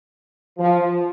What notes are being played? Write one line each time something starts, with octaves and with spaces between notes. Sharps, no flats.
F3